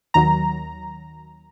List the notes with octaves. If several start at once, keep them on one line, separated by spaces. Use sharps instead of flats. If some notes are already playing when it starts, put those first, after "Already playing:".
D#2 D#3 F#3 A#5